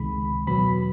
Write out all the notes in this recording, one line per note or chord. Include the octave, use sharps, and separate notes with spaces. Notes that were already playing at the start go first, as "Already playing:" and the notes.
Already playing: C#2 C3 D#3 G#3 B5
E2 B2 F#3 B3 B5